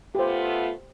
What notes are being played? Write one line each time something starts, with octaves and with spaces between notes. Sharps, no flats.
A3 B3 F4 G4 C5